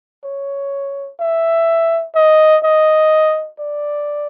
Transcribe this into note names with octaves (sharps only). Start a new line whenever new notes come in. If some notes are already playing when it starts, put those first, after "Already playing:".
C#5
E5
D#5
D#5
D5